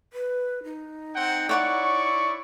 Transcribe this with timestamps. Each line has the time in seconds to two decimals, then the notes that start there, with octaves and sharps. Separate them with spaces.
0.13 B4
0.64 D#4
1.14 C4 F#5 G5
1.49 E4 C#5 D5 F#5 C#6 D6